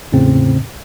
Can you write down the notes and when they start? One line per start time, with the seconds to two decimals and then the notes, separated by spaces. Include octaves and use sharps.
0.12 E2 A2 C#3 C4